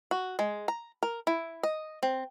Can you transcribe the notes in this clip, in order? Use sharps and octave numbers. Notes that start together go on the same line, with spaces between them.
F#4
G#3
A#5
A#4
E4
D#5
C4